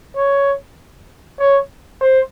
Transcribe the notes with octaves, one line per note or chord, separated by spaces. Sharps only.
C#5
C#5
C5